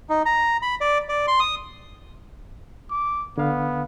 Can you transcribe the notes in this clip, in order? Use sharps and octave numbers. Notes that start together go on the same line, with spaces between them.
D#4
A#5
B5
D5
D5
C6
D#6
D6
D3 B3 F5